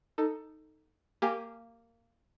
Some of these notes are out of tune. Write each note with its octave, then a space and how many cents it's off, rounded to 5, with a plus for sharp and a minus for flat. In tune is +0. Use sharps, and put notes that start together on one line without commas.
D#4 +0 A4 +15
A#3 -15 G4 +0 G#5 +0